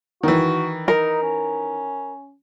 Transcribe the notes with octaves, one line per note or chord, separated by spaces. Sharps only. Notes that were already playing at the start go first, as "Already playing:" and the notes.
D#3 E3 F#4
D#4 A#4
C#4